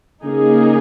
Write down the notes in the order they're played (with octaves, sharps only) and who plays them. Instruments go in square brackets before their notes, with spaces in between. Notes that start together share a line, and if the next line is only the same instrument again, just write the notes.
[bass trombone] C#3 [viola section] A#3 D#4 G#4